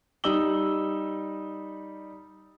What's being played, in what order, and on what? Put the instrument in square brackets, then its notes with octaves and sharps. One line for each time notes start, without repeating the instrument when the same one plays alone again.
[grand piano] G3 D#4 D#6 E6 F#7 G7